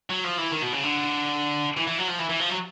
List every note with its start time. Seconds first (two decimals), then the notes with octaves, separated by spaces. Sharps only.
0.10 F#3
0.24 F3
0.38 E3
0.52 D#3
0.62 B2
0.73 C#3
0.83 D3
1.77 E3
1.87 E3
1.98 F#3
2.08 F3
2.19 E3
2.30 E3
2.40 F3
2.50 F#3